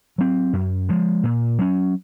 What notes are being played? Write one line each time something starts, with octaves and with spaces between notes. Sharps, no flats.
F#3 C4
F#2
F3 G#3
A#2
F#3 C#4